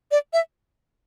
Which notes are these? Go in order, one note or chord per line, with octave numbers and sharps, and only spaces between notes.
D5
E5